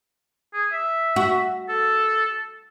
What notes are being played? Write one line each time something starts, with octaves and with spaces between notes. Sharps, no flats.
G#4
E5
F#4
A4